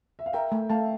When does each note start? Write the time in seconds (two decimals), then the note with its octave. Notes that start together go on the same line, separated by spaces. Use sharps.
0.19 E5
0.26 F5
0.33 A#4 E5 G5
0.52 A3
0.69 A3 F5 A5